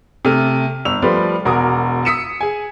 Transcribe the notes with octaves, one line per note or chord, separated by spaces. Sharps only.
C3 A3 F6
G1 E6 F7
F3 G3 A3 B4 C5 D5
E1 F#4 A#4 D6 D#6
D#6 E6 B6 C#7 D#7 E7
G#4 G#5